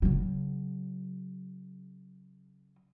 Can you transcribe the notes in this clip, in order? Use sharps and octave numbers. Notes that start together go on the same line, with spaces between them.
C#3 F#3